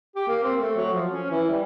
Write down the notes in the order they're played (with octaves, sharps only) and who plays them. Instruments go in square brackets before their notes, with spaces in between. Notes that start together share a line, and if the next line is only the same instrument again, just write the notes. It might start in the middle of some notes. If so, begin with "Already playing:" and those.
[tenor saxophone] G4
A#3
C4
A3
F#3
F3
C#4
E3
G3